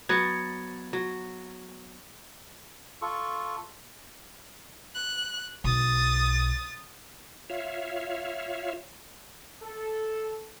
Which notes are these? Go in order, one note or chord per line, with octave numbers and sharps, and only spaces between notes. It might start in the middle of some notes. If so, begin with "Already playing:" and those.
F#3 B3 G#6 A6 C#7
F#3
F4 A4 C#6
F#6
B1 D#6 A6
F4 C#5 E5 F5
A4